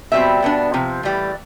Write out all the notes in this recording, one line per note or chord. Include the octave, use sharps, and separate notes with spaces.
B2 G3 C4 E5
B2 B3 D4
C3 F3
A2 E3 G3